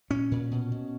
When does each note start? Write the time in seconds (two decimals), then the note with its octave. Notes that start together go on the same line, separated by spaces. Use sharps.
0.10 A#2 C#4
0.31 A#2
0.51 B2
0.72 B2